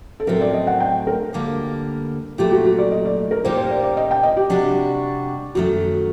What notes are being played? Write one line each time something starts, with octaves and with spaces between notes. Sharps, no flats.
A4
A2 F#3 A3 C4 A#4
D5
D#5
F#5
G5
A#4
D2 D3 G3 A#3
A#2 F#3 A3 G4
F#4
F#4
D5
D#5
D5
A#4
A#2 G3 A#3 D#4 G4 C5
C5
D5
D5
D#5
G5
D#5
G4
C3 G3 D4 F#4
F#2 D#3 F#3 A3 F#4